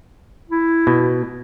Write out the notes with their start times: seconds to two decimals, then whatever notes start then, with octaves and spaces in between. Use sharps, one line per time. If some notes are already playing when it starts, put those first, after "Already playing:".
0.50 E4
0.87 B2